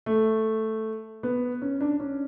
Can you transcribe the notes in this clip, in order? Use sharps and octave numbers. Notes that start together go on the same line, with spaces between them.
A3
B3
C#4
D4
C#4